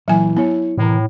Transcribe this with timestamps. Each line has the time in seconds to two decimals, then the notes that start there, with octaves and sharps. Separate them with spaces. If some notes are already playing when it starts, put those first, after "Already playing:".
0.08 A#2 E3 F#3 G#5
0.37 B3 E4 C#5
0.78 A2 C3 E3 A#4